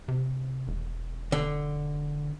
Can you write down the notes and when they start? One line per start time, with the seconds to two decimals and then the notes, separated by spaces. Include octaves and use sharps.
0.08 C3
0.68 E1
1.32 D3